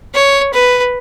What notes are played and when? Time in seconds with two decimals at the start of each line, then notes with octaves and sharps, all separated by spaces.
0.14 C#5
0.54 B4